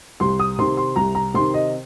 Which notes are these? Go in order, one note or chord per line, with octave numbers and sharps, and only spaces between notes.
C2 C6
D#6
C3 D#3 C6
C6
C2 A#5
A#5
C3 D#3 C6
D#5